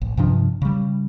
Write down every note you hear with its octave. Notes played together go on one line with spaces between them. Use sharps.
A1
G2 C3 F3 D4
C#3 G3